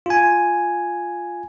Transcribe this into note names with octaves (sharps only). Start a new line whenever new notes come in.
F4 G#5